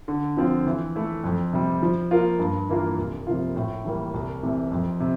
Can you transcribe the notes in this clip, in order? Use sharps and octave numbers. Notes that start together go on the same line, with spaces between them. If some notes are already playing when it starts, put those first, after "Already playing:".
D3
F3 C4 F4
E3
A3 E4
F2
C3 G3
F3
A#3 F4 A#4
G2
E3 A#3 F4 A#4
C2
C3 F3 A#3 F4
A2
E3 G3 A#3
C2
C3 E3 A3
F2
C3